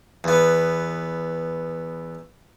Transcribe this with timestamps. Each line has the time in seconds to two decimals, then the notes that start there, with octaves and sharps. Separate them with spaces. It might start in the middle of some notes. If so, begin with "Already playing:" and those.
0.24 E2 B3